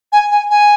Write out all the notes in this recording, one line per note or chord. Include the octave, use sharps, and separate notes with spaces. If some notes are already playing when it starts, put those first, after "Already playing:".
G#5
G#5
G#5